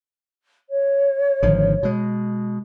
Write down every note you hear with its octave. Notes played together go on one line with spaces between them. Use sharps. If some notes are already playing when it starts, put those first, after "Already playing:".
C#5
G#1 D3 F3
B2 G#3